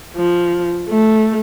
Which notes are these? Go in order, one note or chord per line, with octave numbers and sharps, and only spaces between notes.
F3
A3